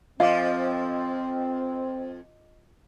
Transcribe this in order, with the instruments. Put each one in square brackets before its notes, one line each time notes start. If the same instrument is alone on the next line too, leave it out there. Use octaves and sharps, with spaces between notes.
[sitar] F2 F3 [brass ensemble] C4 [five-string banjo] F4 [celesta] D#5 D6